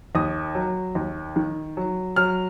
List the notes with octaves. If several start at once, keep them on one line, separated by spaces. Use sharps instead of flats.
D#2 D#6
F#3
D#2
D#3
F#3
F#3 F6